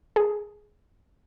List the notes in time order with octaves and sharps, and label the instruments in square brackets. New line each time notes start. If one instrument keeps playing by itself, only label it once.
[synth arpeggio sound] G#4